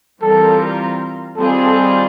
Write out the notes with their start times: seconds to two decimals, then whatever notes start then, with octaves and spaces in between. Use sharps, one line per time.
0.22 E3 G3 C4 F4 A4 A#4
1.36 D#3 G3 C4 F4 G#4 A4
1.65 A4